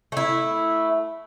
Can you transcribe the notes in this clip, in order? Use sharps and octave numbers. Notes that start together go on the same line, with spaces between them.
A3 E4